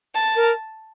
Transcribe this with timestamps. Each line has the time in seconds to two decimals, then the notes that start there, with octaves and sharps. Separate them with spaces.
0.15 A5
0.36 A#4